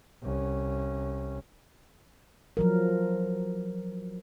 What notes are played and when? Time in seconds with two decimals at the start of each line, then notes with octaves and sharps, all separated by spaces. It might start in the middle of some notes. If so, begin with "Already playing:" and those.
0.22 C2 C#4
2.57 F3 F#3 A#4